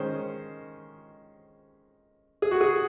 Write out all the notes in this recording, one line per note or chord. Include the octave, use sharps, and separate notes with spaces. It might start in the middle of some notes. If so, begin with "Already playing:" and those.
Already playing: D#3 G#3 C#4 C5
G#4
F#4
G#4